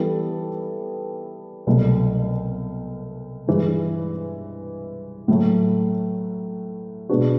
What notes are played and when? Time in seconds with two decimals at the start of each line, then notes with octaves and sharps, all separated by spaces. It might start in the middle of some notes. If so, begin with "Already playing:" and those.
Already playing: E3 G3 B3 E4 A4
1.67 C2 B2 F#3 A3
3.48 G2 E3 G#3
5.28 A2 F#3 A3
7.09 B2 G#3 B3 D4 F#4